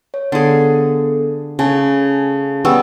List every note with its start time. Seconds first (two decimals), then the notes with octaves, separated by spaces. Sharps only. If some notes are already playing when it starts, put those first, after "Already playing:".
0.14 C#5
0.32 D3 B3 G#4 A4
1.59 C#3 A3 C#4 G#5 A5
2.65 G3 B3 C#4 C#6 E6